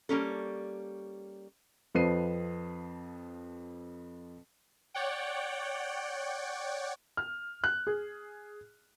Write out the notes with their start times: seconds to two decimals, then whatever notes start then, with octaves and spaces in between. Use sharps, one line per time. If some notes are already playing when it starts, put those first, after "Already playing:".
0.09 G3 A#3 C#4 A4
1.95 F2 F3 B4 C5 C7 D#7
4.94 C#5 D5 F#5 G5
7.17 F6
7.64 F#6
7.87 G#4